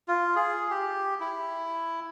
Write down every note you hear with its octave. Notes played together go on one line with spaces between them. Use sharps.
F4
G#4
G4
E4